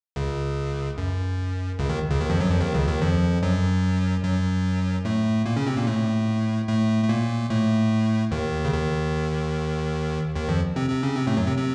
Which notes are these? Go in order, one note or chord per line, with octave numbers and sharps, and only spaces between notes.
C#2 C#3
F#2
C#2 C#3
D#2 D#3
C#2 C#3
D#2 D#3
F2 F3
F#2 F#3
F2 F3
D#2 D#3
C#2 C#3
D#2 D#3
F2 F3
F#2 F#3
F#2 F#3
A2 A3
A#2 A#3
C#3 C#4
C3 C4
A#2 A#3
A2 A3
A2 A3
A3
A#2 A#3
A2 A3
D#2 D#3
C#3
D#2 D#3
D#2 D#3
F2 F3
C3 C4
C3 C4
C#3 C#4
C3 C4
A2 A3
F#2 F#3
C3 C4
C3 C4